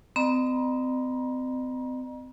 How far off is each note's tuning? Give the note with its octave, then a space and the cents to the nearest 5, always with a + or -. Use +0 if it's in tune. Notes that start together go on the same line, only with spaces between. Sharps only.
C4 -35 D#5 -45 A#5 +35